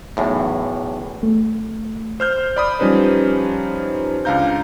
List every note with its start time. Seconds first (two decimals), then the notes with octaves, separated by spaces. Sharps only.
0.17 B1 E2 A2
1.23 A3
2.20 C5 F6 G6
2.56 D5 B5 D#6
2.79 F3 G3 C#4 D#4 B4 C5
4.25 C#2 D4 F5 A#5 G6